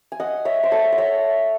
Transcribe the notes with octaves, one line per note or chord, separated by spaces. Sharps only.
G#5
D#5 F#5
C#5 E5
C5
A4 C#5
F#5
C#5 E5